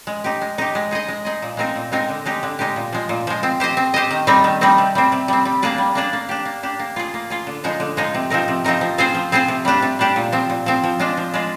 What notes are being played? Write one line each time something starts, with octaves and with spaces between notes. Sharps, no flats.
G#3
D#4 G4
G#3
D#4 G4
G#3
D#4 G#4 D#5
G#3
D#4 G#4 D#5
A#2
G#3 C4 D#4 A#4
A#2
G#3 C4 D#4 A#4
D3
G#3 D#4 G4
D3
G#3 D#4 G4
A#2
F3 G#3
A#2
F3 G#3
C4
G4 C5 D#5
C4
G4 C5 D#5
D#3
G3 C4 D#4
D#3
G3 C4 D#4
C3
G3 C4
C3
G3 C4
G3
A#3 D4 G#4 D5
G3
A#3 D4 G#4 D5
A#3
D4 G4
A#3
D4 G4
A#3
F4 G#4
A#3
F4 G#4
D3
F3 G#3 D#4 G#4
D3
F3 G#3 D#4 G#4
C3
F3 C4 D#4 A#4
C3
F3 C4 D#4 A#4
F3
C4 F4 G#4 C5
F3
C4 F4 G#4 C5
C3
G3 D4 G4
C3
G3 D4 G4
A#2
F3 C4
A#2
F3 C4
F3
G#3 D4 F4
F3
G#3 D4 F4